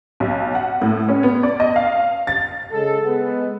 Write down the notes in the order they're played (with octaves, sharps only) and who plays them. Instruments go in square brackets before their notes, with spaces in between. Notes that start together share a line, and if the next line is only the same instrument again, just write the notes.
[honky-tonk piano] B1
F#5
A2
C#4
B3
D5
D#5
F5
A6
[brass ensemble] C#3 G#3 A4
G#3 B3